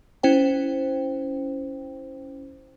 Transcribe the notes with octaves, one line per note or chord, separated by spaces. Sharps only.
C#4 E4 C5 G5